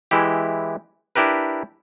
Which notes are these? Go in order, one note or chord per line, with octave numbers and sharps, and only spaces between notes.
E3 G#3 E4 G4
D4 E4 G4 A#4 B4